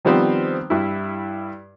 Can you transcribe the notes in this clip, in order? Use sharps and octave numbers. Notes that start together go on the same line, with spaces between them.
D#3 F3 G3 B3 C4 C5
G2 E4